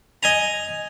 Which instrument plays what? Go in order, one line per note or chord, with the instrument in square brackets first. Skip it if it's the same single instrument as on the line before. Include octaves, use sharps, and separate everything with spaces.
[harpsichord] D#5 G#5 A#5